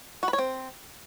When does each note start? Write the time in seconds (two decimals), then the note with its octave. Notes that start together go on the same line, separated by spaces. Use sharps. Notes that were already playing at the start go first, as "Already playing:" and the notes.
0.23 F#4
0.28 B4
0.33 C#5
0.38 C4